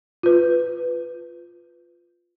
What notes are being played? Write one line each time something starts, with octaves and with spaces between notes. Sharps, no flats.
F4 B4